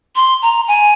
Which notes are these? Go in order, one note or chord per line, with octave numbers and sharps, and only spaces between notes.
C6
A#5
G#5